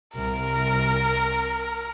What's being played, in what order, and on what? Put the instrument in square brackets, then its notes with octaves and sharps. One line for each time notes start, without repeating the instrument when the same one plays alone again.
[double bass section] C2 [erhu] A#4